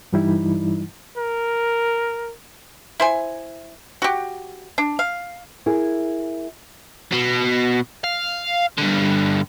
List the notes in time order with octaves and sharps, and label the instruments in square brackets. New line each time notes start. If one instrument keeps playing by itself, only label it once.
[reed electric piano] G2 E3 G3 D#4 E4
[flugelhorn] A#4
[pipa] E4 C5 G#5
F#4 G4
D4
F5
[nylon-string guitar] E4 G#4 A#4
[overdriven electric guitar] B2
F5
G2 D3